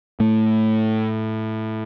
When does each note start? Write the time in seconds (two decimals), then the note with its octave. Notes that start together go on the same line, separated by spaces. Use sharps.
0.20 A2 A3